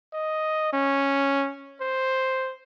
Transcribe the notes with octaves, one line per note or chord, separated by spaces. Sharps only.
D#5
C#4
C5